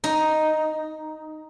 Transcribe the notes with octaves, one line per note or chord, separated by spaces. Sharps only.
D#4